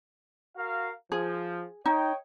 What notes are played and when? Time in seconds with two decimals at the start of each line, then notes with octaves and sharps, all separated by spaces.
0.57 F#4 A#4 F5
1.12 F3 G#4
1.86 D#4 C#5 D#5 G5